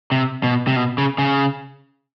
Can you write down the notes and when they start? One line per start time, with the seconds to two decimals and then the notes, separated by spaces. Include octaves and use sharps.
0.12 C3
0.43 B2
0.67 C3
0.76 B2
0.98 C#3
1.18 C#3